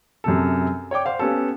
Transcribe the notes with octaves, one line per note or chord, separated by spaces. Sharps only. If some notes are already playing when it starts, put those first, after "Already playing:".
F#2 C3 A4
C#5 D5 G5 D6
C5 F5 F#5
B3 C#4 G4 A4